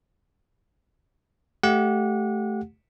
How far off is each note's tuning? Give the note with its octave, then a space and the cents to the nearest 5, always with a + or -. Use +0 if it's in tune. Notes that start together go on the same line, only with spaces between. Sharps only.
A3 -15 G4 -15 F#5 -30